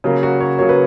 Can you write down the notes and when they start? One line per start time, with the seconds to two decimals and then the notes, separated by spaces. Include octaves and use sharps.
0.04 C#3 F#3 A#3
0.23 F#4
0.40 C#5
0.58 C#3 F#3 A#3 C#5
0.69 B4